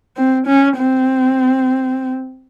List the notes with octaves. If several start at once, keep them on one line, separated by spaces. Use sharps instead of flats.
C4
C#4
C4